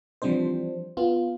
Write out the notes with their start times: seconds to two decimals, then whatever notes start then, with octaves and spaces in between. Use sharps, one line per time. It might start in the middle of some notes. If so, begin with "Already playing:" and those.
0.22 E3 F3 G3 C4 D4 C5
0.97 B3 F4